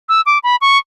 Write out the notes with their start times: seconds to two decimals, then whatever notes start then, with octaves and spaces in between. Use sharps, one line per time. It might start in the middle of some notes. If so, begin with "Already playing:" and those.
0.09 E6
0.26 D6
0.43 B5
0.61 C#6